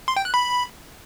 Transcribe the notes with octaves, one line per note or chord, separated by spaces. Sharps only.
C6
G5
F#6
B5